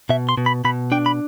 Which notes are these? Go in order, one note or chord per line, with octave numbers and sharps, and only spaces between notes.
B2 E5
C6
B2
B5
B2 B5
D4 G5
B5